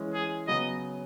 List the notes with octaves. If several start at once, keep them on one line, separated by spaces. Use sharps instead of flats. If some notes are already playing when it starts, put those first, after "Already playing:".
Already playing: E3 G#3 C#4
G#4
C#3 F#3 B3 F#4 D#5